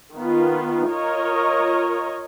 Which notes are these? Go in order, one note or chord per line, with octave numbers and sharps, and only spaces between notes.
D#3 B3 F4
F4 A#4 C#5 D#5